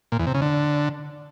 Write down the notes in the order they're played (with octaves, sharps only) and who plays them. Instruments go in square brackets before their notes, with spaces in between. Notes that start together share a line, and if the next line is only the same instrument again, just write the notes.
[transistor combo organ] A#2
E2
C3
C#3
D3